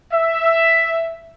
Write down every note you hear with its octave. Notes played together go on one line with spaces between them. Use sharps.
E5